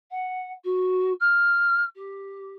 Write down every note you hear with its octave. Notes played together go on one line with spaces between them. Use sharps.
F#5
F#4
F6
G4